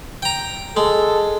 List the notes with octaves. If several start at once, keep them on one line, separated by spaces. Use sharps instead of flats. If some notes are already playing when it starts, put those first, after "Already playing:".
G5 A#5
G#3 A4